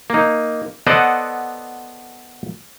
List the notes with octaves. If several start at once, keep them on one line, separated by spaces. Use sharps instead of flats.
A#3 D#4
B3 A4 C5 D5 D#5 F#5